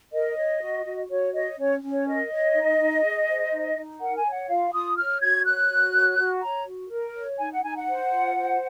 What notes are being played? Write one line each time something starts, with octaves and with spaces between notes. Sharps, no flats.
A#4 D#5
C#5
F#4
F#4
F#4 C#5
C#5 D#5
C#4 C#5
C#4
C#5
A#4 D#5
C#5
D#4
D#4
G#4
C5
D#4
D#4
A#4 F#5
G#5
C#5
F#5
F4 F5
F4 D#6
C#5 F6
F#4 G#6
C#5 F#6
F#4
C#5
F#4
C#5 A#5
F#4
A#4
C#5
D#4 G#5
F#5
D#4 G#5
F#5
C5
F4
C5